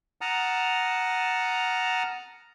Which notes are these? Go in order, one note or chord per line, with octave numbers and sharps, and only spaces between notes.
F#5 A5 A#5 D#6 F6